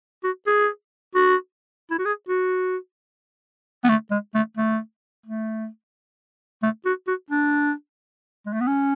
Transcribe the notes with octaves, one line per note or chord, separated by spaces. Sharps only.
F#4
G#4
F#4
E4
F#4
G#4
F#4
B3
A3
G#3
A3
A3
A3
A3
F#4
F#4
D4
G#3
A3
B3
C#4